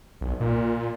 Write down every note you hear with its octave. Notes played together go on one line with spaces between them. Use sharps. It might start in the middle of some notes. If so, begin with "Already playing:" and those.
B1
A#2